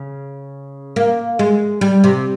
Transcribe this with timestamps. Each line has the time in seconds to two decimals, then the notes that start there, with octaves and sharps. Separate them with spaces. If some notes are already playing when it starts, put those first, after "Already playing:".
Already playing: C#3
0.96 A#3
1.39 G#3
1.81 G3
2.04 C3